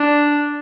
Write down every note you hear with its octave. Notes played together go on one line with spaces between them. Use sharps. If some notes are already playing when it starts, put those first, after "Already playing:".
Already playing: D4